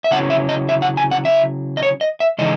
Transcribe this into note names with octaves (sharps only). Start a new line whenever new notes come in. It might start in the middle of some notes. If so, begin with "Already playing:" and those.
E5
C#3 F#3 C#4 E4 F#5
E5
D#5
E5
F#5
G#5
F#5
E5
D#5
C#5
D#5
E5
C#3 E3 G#3 D#4 D#5